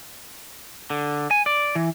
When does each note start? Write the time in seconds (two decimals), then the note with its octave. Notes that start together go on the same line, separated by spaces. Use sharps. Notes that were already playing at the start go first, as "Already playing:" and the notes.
0.90 D3
1.31 G#5
1.46 D5
1.75 E3